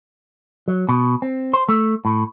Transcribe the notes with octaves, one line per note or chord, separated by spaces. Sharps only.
F#3
B2
C4
C5
A3
A2